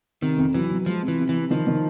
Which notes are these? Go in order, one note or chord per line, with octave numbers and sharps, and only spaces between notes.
C3 D#3
F2
E3 F#3
F#3
F3 G#3
C3
E3
C3
E3
C3
D#3 F3
D#3